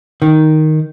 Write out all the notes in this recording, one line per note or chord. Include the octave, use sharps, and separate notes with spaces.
D#3